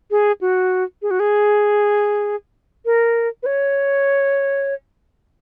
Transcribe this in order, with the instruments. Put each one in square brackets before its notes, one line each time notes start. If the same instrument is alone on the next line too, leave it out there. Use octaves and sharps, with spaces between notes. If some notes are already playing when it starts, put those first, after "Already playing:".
[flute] G#4
F#4
G#4
F#4
G#4
A#4
B4
C#5